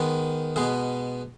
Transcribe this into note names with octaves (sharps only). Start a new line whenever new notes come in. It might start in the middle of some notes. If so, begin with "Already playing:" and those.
Already playing: D#3 G#3 B3
B2 G#3 B3 G#4